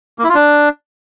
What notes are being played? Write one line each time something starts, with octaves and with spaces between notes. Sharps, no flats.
A#3
E4
F4
D4